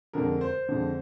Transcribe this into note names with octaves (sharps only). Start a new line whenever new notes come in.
F2 D3 G#3 A#4
C5
F2 D3 G#3